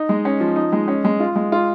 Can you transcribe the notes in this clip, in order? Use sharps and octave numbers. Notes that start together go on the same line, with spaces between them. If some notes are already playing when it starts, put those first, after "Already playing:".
Already playing: D#4
G#3
C#4
F3
D#4
G#3
C#4
G#3
F4
G#3
F4